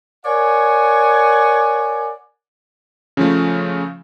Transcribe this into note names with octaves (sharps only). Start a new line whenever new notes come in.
A#4 C#5 D5 F#5 G#5
C#3 F3 A3